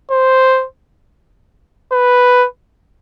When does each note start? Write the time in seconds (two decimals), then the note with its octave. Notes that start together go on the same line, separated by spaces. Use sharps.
0.11 C5
1.92 B4